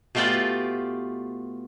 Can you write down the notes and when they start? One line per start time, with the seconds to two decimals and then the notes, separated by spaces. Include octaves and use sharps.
0.15 B2 A3 F4 G4 B4 D5